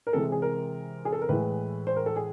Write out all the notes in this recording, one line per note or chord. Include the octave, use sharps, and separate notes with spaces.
A#4
C3 E3 G#3 A4
G#4
A#4
G#4
A4
A#4
A2 E3 G#3 B4
C5
A#4
A4
G#4